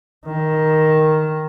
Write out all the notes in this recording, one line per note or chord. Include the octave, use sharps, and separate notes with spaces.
D#3